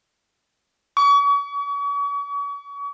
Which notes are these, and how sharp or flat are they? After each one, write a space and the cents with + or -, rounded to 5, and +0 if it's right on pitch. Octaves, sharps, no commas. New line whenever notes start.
C#6 +40